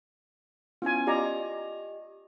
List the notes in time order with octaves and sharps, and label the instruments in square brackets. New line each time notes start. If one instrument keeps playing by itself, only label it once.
[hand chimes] B3 C#4 E4 [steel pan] F4 G#5
[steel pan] F4 D5 A#5 [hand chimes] G4 D#5